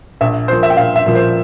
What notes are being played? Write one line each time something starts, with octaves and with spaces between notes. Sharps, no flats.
A#1 E5
A#2 F3 C5
E5
G5
A#1 F5
E5
A#2 F3
C5